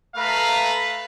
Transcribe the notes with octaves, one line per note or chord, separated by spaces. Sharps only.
A3 B4 F5 A#5